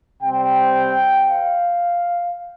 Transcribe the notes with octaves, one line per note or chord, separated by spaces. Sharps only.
C3 G3 C4 G5
F5